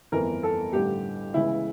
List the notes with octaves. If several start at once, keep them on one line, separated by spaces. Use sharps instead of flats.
G1 F2 E3 A#4
A4
A1 G2 D3 G4
C#2 C#3 E3 E4